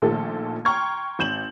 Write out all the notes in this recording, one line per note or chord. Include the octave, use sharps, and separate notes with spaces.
A#1 A#2 D#3 F3 A3 A4
G5 A#5 C6 C#6 F6 G#6
G#1 G6 E7 F#7